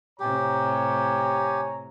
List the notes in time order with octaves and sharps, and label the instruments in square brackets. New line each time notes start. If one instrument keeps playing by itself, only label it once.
[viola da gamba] A2 C3 [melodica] G4 [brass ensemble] C#5 G#5 A#5